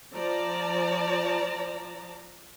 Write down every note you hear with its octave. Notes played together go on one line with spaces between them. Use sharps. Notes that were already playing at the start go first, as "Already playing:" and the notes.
F3 D5 A5 A#5